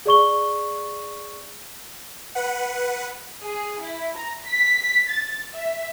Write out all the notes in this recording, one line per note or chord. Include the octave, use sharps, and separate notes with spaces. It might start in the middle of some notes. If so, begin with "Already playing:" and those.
G#4 D5 C#6 G7
B4 F#5
G#4
E4
A#5
B6
A6
E5